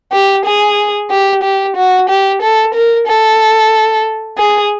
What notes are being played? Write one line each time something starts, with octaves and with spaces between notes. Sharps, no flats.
G4
G#4
G4
G4
F#4
G4
A4
A#4
A4
G#4